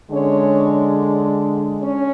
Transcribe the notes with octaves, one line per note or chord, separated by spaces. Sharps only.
D3 G#3 C#4 D4 C#5
C#4 C#5